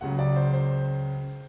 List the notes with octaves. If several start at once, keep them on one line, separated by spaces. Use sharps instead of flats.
C#2 C#3 F#3 F#5
D5
C5
C5